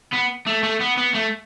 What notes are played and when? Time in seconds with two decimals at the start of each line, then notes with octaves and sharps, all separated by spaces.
0.12 B3
0.46 A3
0.63 A3
0.80 B3
0.97 B3
1.14 A3